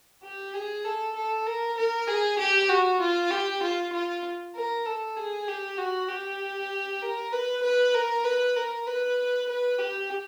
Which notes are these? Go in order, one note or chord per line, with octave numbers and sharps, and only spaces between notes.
G4
G#4
A4
A4
A#4
A#4
G#4
G4
F#4
F4
G4
F4
F4
A#4
A4
G#4
G4
F#4
G4
A#4
B4
B4
A#4
B4
A#4
B4
B4
G4